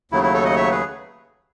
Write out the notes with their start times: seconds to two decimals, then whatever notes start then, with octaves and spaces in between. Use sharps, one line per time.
0.12 D#2 C#3 F#3 A3 E4
0.23 E4
0.34 A4 C#5
0.45 D#5 F#5
0.56 C#5 E5
0.71 G#4 B4